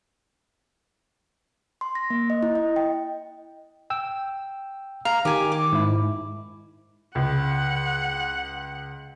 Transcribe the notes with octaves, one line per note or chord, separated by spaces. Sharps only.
C6
A#6
A#3
D#5
E4
D#5
G5
G5 E6
F5 A#5
D#3 G4 G#5
D6
G#2 E4
C#2 F#5